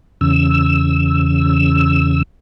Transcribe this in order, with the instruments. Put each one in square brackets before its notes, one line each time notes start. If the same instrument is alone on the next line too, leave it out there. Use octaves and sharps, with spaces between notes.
[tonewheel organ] E2 C#3 E6